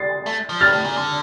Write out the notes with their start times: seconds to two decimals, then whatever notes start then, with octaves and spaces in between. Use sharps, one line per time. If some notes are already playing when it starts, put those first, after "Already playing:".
Already playing: A6 C7
0.26 A3
0.49 F3
0.61 G2 F6 A6
0.72 A2
0.84 A#2
0.96 D3